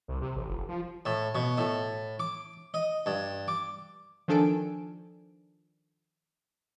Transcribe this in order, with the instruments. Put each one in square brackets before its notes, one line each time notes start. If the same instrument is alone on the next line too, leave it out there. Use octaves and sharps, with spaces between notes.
[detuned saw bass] C2
C3
A1
F1
F3
[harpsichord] A2
B2
A2
D6
D#5
G2
D6
[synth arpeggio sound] D#3 F3 D4 A4 G#5 D7